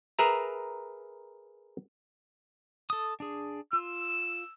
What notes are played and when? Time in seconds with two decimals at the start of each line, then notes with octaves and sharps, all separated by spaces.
0.19 G#4 A#4 B4 E5 A#5
2.90 A4 D#6
3.20 D4 G#4
3.73 F4 E6